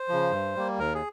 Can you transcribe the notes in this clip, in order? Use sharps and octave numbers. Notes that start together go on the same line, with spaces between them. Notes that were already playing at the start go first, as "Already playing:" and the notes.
Already playing: C5
C#3 F3
G2
G3 A#3
D#2 A#4
G#4